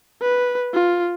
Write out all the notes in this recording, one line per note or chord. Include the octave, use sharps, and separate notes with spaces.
B4
F4